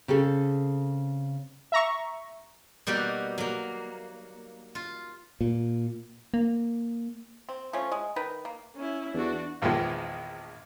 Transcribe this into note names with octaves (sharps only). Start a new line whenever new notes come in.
C#3 C4 G#4 A4
E5 A#5 C#6
B2 G3 A#3 D#4 F#4 G4
F#3 A#3
F4
A#2
A#3
C4
F3 A3 C#4
G#3
D#3 A#4 B4
A#3
C#4 E4
E2 D4 F#4
A#1 E2 D#3 F3 G#3